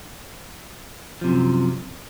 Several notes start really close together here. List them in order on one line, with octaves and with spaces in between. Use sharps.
F3 C3 F#2